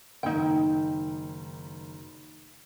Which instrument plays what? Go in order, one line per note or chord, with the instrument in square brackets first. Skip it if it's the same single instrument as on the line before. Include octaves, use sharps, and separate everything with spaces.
[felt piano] F#1 D#3 [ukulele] D#4 G5